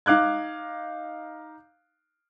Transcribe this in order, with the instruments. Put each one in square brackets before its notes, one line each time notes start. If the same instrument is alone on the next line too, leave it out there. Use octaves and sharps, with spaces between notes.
[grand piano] D#4 F5 D6 F#6 G#6